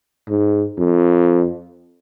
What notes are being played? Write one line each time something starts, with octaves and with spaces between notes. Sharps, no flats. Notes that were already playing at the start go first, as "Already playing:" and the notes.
G#2
F2